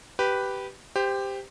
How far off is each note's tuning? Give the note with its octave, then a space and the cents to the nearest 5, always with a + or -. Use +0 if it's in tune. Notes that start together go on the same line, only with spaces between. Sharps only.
G4 -10 B4 +0
G4 +10 C5 -20